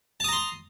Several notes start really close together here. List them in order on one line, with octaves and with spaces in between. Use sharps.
A5 D#6 A#5 C6